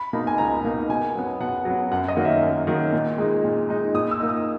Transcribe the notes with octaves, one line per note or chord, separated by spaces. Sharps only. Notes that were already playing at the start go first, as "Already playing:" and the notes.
Already playing: B5
B2 A#3 D#4
G#5
C#2 A#5
B2 A#3 D#4
B2 G#5
F#3 B3
B2 F#5
F#3
B3
F#2 F#5
D#5
D#3 F#3 A#3
E5
F#2
D#3 F#3 A#3
A#2
G#3 D#4
A#2
G#3 D#4
A#2 D#6
E6
A#3 D#4
D#6